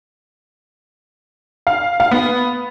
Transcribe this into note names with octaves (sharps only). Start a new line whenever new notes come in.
F5
F5
B3